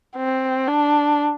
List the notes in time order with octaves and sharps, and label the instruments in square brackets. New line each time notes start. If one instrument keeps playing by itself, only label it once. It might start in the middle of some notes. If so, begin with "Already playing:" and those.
[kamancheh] C4
D4